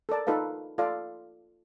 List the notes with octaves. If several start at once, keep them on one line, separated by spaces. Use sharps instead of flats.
A4 A#4 D5 A5
D#4 F4 A4 B4 F5
F4 A4 D5 F5